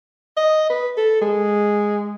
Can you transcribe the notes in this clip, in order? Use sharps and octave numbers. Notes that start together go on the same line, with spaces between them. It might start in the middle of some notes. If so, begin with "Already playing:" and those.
D#5
B4
A4
G#3